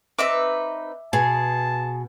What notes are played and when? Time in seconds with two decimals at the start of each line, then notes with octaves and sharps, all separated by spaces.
0.19 C4 D#4 B4 E5 D6
1.13 B2 G#4 A5